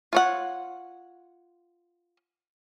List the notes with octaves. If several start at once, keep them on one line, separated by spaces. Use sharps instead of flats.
F4 C#5 F#5